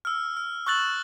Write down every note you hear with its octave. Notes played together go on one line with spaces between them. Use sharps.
E6 F6
F6
C#6 E6 F#6 A6 F#7